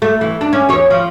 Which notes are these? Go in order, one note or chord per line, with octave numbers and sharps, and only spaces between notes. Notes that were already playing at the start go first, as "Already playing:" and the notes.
A3
E3
D4
C#4
E2 C#5
F3